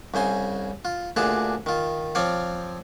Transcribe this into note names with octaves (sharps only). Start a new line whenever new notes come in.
C2 C#3 C5 G#5
F4
D2 A#2 D4 G#4 A5
D#3 F4
F3 C4 C#5 D5 F5